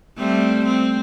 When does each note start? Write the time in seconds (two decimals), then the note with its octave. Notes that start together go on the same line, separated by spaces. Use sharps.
0.18 G3 A3 C4
0.65 C4